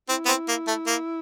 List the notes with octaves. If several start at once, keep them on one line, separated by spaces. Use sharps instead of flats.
C4 E4
B3
C4
A#3
A3
A#3